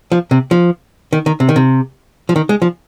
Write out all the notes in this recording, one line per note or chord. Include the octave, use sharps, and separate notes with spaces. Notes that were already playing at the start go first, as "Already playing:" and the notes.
F3
C3
F3
D#3
D#3
C3
D#3
C3
F3
D#3
G#3
F3